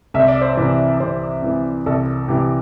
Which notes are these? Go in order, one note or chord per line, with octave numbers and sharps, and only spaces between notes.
C2 E5
D5
C5
C3 E3 D5
C2 C5
C3 E3
C2 A4
C3 E3 G4